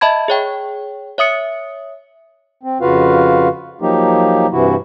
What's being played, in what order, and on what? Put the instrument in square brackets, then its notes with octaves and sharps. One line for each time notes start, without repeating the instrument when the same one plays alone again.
[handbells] D#5 E5 A5 B5 G#6
G#4 C#5 G5
C#5 E5 D#6 C#7
[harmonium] C4
F2 C#3 F4 F#4 B4 F5
F3 F#3 A#3 D#4 G4
G2 C3 E3 E4 F#4